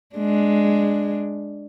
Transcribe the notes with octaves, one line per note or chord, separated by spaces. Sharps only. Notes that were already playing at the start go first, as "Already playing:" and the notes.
G#3 D4